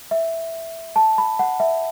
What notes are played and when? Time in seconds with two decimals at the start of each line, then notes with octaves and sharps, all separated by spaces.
0.11 E5
0.96 A5
1.18 B5
1.39 F#5
1.60 E5